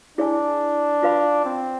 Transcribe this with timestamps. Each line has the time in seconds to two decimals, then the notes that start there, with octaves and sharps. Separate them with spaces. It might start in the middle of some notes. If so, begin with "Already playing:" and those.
0.18 D4 E4 G#4 D5 G#5
1.03 F4 B4 F5 B5
1.45 C4